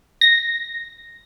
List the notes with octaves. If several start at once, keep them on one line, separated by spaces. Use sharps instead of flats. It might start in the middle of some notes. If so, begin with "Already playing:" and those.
A#6